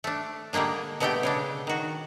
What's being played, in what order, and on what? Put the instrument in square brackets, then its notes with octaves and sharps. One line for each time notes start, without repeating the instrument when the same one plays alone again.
[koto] A3 D4
D3 G3 G#3 A#3 D4
B2 D3 G#3 A3 G4 G5
C#3 G#3 D4
D#3 F#4